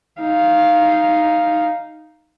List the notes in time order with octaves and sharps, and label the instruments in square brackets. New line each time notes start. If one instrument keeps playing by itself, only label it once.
[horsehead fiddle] D#4 F5